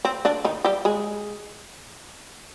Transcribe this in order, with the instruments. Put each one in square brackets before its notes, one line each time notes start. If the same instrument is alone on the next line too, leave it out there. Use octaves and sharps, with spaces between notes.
[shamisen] C4
D3 D4
D#3 D#4
G3 G4
G#3 G#4